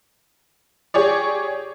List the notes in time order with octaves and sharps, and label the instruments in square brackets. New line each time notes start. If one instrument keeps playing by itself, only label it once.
[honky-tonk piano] G4 G#4 C#5 D5